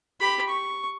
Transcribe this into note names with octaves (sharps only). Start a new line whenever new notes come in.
G4 B5
C#6